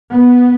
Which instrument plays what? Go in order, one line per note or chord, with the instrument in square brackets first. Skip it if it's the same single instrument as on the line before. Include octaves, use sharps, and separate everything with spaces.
[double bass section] B3